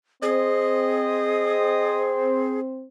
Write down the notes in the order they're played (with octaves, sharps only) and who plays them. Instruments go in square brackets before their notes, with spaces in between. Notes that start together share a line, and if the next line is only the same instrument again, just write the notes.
[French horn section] C4 C5 [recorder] G#4 [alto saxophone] D#5